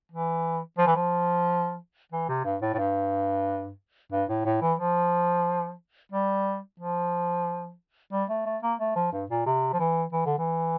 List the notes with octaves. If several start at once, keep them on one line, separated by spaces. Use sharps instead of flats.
E3
F3
E3
F3
E3
C3
G2
A2
A2
G2
G2
A2
A2
E3
F3
G3
F3
G3
A3
A3
A#3
A3
F3
G2
A#2
C3
F3
E3
E3
D3
E3